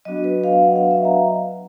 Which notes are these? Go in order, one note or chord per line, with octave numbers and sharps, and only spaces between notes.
F#3 B3 D4 F#4 D#5
B4
F5
F#5
F5
E5
A#5